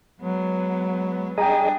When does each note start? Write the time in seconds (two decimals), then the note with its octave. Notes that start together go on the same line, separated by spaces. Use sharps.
0.20 F#3 G#3 B3
1.38 G3 D4 G#4 D#5 G5 A#5